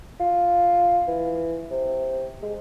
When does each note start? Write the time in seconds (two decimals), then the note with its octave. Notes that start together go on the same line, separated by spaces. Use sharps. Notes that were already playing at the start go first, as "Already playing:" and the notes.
0.20 F4
1.08 E3
1.71 C3
2.43 G#3